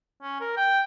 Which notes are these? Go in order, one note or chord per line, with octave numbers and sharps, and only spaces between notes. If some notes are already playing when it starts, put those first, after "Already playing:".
C#4
A#4
G5